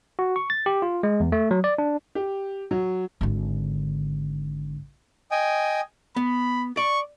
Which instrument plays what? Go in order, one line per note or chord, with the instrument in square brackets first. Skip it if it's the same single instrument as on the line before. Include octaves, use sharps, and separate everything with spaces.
[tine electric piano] F#4
C#6
A6
G4
F4
G#3
E2
A3
F#3
D5
D4
[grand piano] G4
F#3
[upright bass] G#1 D3
[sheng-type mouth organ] D#5 G5 G#5
[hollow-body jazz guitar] B3 [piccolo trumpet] B5
[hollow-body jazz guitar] D5 [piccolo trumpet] C#6